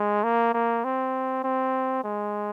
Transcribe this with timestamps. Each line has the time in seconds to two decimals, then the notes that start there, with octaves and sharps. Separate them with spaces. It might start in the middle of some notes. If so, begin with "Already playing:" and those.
Already playing: G#3
0.24 A#3
0.53 A#3
0.84 C4
1.44 C4
2.04 G#3